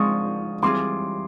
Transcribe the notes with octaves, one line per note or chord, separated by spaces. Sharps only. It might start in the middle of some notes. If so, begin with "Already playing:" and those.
Already playing: F3 G#3 C4 C#6 D#6
E3 G3 C4 F4 G#4 C6 D6